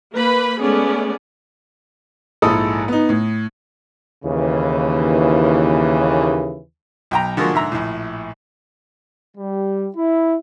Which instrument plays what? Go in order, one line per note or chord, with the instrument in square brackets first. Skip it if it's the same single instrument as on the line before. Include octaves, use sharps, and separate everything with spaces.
[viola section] A#3 B4 B5
G#3 A3 B3 C#4 G#4 D5
[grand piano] A#1 G#2 E4 A4 B5 D#6
B3 D#4
A2
[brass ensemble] D#2 C#3 E3
[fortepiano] B1 G5 A#5
D3 F3 G#3 A#3 F#4
G#2 D3 E5 A#5
A#1 A2
[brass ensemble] G3
E4